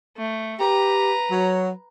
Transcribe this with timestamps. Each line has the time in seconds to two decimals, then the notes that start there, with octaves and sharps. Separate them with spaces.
0.18 A3
0.60 G4 B4 A#5
1.30 F#3